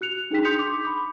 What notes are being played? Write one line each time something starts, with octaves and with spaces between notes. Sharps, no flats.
F#4 F#6 C#7 F7
D4 D#4 G#4 G5 B6
C6 D#6 G6 C#7 F7
D6 G6
B5 D6